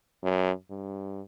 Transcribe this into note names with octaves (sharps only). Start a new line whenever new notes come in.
F#2
G2